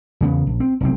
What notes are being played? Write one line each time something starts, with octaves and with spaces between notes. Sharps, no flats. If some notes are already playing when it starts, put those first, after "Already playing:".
E2 C#3 B3
A#1
C4
F1 B1 C4